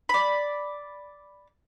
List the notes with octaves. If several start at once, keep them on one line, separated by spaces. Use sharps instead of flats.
D5 B5